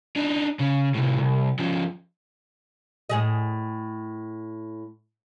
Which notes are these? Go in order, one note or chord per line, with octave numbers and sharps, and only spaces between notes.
D4 D#4
C#3
A2 C3
C2
F3 C#4
A2 G#4 D#5